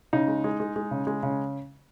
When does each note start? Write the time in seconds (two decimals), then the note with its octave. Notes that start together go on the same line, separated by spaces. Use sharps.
0.13 C#3 D#4
0.28 G#3
0.44 G#3
0.60 G#3
0.76 G#3
0.91 C#3
1.07 G#3
1.23 C#3